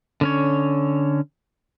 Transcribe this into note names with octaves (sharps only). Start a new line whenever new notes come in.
D3 C#4 C#5